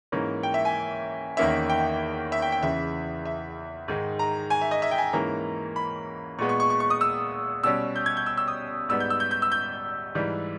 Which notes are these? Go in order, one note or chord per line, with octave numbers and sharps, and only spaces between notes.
G#2 E3 A#3 C#4
G5
E5
G#5
E2 D#3 A#3 C#4 E5
G5
E5
G5
G5
E2 C#3 E3 E5
E5
G#2 D#3 G#3
A#5
G#5
E5
D#5
E5
G5
G#5
G#2 E3 A#3 C#4 A#5
B5
A#2 G#3 B3 C#6
C#6
C#6
C#6
C#6
D#6
E6
B2 G3 C#4 E6
G6
G#6
G6
E6
E6
D#6
G#2 G3 B3 E6
G6
E6
G6
G6
E6
G6
G#2 E3 G3